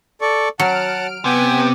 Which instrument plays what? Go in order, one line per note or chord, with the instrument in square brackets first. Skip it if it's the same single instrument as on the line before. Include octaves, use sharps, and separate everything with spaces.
[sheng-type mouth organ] A4 D5 C#6
[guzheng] F#3 [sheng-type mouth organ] F#5 A5 [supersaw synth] F6 D7
[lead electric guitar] C3 [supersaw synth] B3 G5 [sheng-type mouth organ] G#5